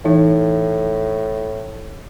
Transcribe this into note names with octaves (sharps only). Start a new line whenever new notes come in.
A2 E3 D#4